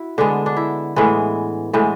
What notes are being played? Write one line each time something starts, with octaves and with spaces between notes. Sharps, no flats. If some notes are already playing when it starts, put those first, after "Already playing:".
Already playing: E4 F#4
D3 G#3 B3 D4
D4
E4
A2 E3 G#3 B3
A2 E3 G#3 B3